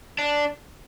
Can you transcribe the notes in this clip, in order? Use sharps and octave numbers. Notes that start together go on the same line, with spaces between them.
D4